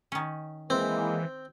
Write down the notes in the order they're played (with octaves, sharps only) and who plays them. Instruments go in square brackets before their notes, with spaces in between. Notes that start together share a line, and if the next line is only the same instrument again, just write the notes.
[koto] D#3 C#4
[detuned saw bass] E3 [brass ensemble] G#3 A#3 [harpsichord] C4